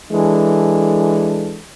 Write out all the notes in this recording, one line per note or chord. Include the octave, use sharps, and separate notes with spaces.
E3 G#3 D4 A4